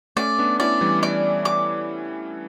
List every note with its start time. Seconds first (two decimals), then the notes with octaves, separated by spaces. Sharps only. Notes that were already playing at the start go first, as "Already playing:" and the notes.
0.16 A3 C#4 D5
0.39 B3 D4
0.60 C#4 E4 D5
0.81 E3 G3
1.03 D5
1.45 D6